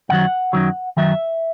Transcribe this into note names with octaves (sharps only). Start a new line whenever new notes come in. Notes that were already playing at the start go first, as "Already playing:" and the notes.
F#2 D#3 F#3 F#5
F#2 D#3 F#3
F#2 D#3 F#3 E5